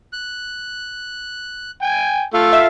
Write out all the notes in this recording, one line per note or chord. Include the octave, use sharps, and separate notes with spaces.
F#6
G5 G#5
A3 F4 A4 F5
E5